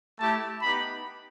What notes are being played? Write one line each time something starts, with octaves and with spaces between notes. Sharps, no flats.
A3 E4 G4 A5
B3 D#4 G4 B5